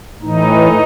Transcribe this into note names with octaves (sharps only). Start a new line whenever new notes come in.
A2 E3 D#4